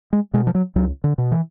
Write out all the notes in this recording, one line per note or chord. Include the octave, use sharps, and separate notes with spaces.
G#3
B2 G#3
F3
F#3
C#2 F#3
D3
B2
E3